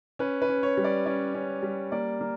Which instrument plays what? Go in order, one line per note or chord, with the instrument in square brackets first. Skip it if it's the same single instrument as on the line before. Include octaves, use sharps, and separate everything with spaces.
[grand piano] C#4 B4
B4
C#4
C#5
G3
D5
C#4 D5
C#4
G3
A#3 D5
A#3